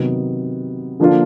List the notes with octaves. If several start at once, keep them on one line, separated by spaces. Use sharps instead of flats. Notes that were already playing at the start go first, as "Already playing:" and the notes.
Already playing: C3 D#3 F#3 B3
D3 F3 A#3 D4 F4